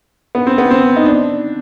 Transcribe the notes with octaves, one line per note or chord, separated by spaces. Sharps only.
B3
C4
B3
C4
D#4
D4